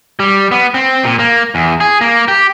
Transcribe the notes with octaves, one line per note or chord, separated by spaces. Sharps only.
G3
B3
C4
A#2
A#3
E2
G#4
A#3
G4